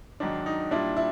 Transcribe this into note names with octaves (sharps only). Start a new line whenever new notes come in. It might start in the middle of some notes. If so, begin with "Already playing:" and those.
G#2 D#3 F#3 D4
D#4
A#2 G3 D4 E4
E4